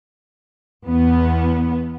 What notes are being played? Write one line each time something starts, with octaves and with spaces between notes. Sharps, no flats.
E2 B3